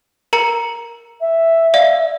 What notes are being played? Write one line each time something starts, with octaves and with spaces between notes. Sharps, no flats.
A#4 A#5 C#7
E5
D5 F5